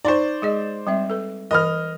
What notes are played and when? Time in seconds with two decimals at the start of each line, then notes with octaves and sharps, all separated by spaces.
0.05 D#4 C5 D5 C6 C#6
0.42 G#3 G#4 D#5
0.87 G3 C4 E5
1.10 A4 B4
1.51 E3 A#4 D#5 F6